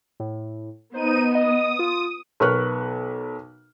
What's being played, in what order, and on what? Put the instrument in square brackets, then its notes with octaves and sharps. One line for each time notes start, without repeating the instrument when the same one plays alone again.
[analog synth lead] A2
[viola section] B3 [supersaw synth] D#4 D#7 [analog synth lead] C5
[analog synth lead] D#5 [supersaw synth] D#6
[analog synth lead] F4
[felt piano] B1 A#4 B4 C#6 F6 F#6